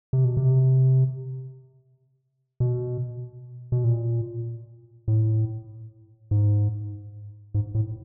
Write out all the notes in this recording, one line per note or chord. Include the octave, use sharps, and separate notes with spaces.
C3
B2
C3
B2
B2
A#2
A2
G#2
G#2
A2